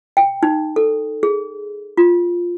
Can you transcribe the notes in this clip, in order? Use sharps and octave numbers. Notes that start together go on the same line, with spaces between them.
G5
D#4
A4
G#4
F4